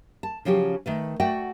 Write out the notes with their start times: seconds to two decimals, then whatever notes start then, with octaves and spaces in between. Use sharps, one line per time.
0.23 A5
0.45 C#3 F3 F#3 C#4 G4
0.86 D#3 A3 B4
1.20 A3 F#4 D5 F#5 G5